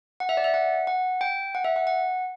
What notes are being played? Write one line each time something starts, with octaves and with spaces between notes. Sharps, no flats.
F#5
E5
D5
E5
F#5
F#5
G5
F#5
E5
F#5
F#5